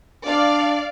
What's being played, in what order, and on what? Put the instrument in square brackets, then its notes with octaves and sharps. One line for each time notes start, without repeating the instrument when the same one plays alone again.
[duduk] D4 [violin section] D5 F5